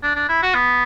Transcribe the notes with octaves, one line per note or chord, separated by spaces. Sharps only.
D4
D4
E4
F#4
B3